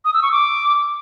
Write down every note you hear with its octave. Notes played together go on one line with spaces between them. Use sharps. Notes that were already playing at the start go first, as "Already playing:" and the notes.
D#6
E6
C#6
D6